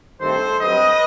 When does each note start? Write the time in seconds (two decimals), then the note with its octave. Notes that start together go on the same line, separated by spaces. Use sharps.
0.21 G2 D#3 A3 C4 A4 C5
0.60 G2 F#3 C4 B4 D#5